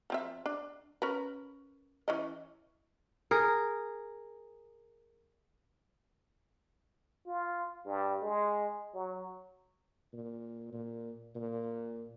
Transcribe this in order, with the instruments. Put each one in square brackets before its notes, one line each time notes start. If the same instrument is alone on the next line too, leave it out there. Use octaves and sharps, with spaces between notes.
[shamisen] F3 C4 E5
D4
C#4 A#4 B4
E3 C#4 D#5
[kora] G#4 A#4
[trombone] F4
G2
G#3
F#3
[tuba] A#2
A#2
A#2